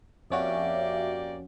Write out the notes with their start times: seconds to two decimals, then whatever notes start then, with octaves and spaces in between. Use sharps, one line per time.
0.30 F2 A#3 C#4 F#4 G4 D5 E5